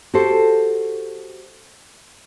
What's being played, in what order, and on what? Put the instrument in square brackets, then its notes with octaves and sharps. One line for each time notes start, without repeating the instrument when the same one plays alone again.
[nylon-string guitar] F#4 G4 A4 C5